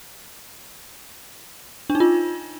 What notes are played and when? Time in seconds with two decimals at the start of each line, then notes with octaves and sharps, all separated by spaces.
1.90 D4
1.95 D#4
2.00 F4